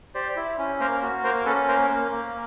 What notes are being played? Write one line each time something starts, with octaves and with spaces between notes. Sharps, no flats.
G4 C5 D5
E4
C#4
A#3 A#4 C5
F#4
A#3 A#4 C5
C#4 A4 B4
A#3 A#4 C5
A#3
A#3